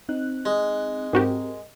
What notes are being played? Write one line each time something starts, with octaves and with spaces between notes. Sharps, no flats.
C4 D#4 F#6
G#3
G#2 C4 F#4 G4 A#4